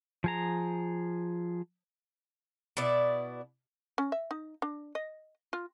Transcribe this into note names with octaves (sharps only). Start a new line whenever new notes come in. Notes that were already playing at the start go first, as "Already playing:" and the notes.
F3 G#4 A#5
B2 E4 D5
C#4
E5
D#4
D4
D#5
F4